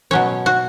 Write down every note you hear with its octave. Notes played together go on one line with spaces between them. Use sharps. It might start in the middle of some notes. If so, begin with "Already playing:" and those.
B2 F#3 C#4 C#5
F#4